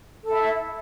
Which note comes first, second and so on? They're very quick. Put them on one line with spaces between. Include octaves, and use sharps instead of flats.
A4 E4 E5